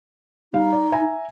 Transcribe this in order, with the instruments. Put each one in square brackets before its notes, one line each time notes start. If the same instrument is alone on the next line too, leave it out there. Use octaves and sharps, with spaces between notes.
[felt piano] G3 F5 [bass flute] D#4
[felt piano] D5
E5 G#5 A#5